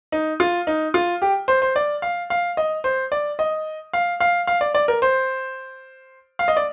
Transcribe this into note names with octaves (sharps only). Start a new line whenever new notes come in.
D#4
F4
D#4
F4
G4
C5
C5
D5
F5
F5
D#5
C5
D5
D#5
F5
F5
F5
D5
D5
A#4
C5
F5
D#5
D5